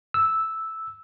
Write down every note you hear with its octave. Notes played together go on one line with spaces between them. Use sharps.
E6